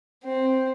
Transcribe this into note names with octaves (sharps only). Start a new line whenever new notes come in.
C4